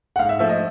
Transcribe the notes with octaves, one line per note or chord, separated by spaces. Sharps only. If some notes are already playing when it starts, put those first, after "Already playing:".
F#5
G#2 F5
E5
F3 A3 E5
D#5